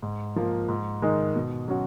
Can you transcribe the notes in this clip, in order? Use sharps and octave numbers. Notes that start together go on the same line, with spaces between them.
G#2
F3 A#3
G#2
D#3 G#3 D#4
B2
F#3 C#4 F#4